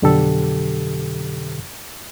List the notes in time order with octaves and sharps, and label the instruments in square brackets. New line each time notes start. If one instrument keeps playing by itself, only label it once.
[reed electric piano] F2 B2 D3 F#3 G4 A4